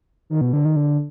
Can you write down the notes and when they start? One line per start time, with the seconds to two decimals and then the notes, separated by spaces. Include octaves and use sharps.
0.30 D#3
0.41 B2
0.53 D3
0.65 D#3
0.76 D3